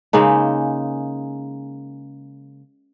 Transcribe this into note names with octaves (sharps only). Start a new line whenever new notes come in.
C#3 G#3 A#3 D#4